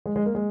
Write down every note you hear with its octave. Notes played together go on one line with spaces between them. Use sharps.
G#3
G#3
A#3
G#3